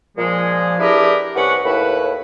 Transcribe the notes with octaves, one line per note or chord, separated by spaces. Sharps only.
A#2 F3 G#3
D4 E4 G4 G#4 A#4 B4
C2 C#4 B4 F#5 C#6
D#2 A2 E4 B4